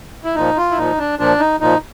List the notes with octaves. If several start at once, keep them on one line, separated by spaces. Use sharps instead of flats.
E4
A#2 F3 D#4
F4
E4
A#2 F3 D#4
D4
A#2 F3 D4
D#4
A#2 F3 D#4